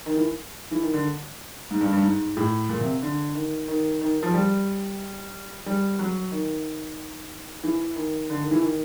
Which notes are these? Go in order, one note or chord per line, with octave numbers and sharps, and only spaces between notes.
D#3
E3
E3
D#3
D3
G#2
G2
G2
G#2
A2
A#2
C3
D3
D#3
D#3
D#3
F3
G3
G3
F#3
D#3
E3
D#3
D3
D#3
E3
D#3